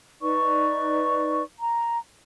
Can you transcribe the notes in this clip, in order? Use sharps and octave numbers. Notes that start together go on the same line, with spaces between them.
D#4 B4 D5 C#6
A#5